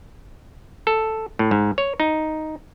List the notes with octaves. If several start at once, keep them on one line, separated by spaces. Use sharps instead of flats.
A4
A2
G#2
C#5
D#4